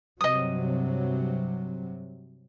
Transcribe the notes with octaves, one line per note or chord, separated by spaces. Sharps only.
G2 C3 F#3 D#5 D#6